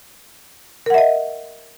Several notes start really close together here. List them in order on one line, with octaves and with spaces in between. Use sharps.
A#4 F#5 E5 D#5